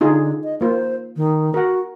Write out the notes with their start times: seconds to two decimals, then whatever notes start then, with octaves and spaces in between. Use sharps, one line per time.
0.01 D3 D#4 F4 G#4
0.44 D#5
0.61 A#3 F4 C5
1.17 D#3
1.54 F#4 A#4 F#5